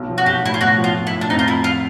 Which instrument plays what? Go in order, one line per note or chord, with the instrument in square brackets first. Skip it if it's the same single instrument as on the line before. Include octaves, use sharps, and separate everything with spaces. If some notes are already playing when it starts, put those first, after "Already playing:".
Already playing: [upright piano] B1
F3
[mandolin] F#4
[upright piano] B1 [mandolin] G4
[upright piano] A2 [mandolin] E4
[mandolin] F4
[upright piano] B1 [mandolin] F#4
[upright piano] F3
[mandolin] F4
[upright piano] B1
[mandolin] E4
[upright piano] A2
[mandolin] D4
[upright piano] F2 [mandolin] D#4
[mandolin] F4
[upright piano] F3 [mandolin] E4
[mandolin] F4